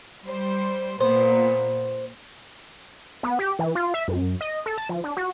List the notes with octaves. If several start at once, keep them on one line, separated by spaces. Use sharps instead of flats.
G3 C5
A#2 B3 C5
B3
G4
E3
F4
E5
F#2
D#5
A4
A5
F3
D4
F#4